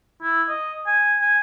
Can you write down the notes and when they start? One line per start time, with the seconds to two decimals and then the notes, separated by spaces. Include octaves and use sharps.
0.22 E4
0.48 D#5
0.86 G#5
1.21 G#5